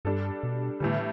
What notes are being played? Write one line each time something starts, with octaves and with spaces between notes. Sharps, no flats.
G2 G3 D4 A4
B2
A2 D3 E3 G3